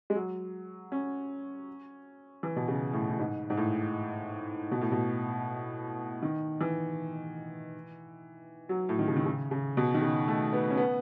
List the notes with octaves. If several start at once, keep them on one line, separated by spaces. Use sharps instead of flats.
G#3
F#3
C#4
E3
B2
C#3
A2
A2
G#2
G#2
A2
B2
A2
B2
D#3
E3
F#3
A2
D#3
C#3
D#3
C#3
C#3
B2
D#3
C#3
A3
B3
C#4
B3